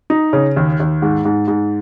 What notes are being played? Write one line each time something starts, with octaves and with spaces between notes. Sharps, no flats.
D#4
C#3
D#2
D#2
G#2
G#2
G#2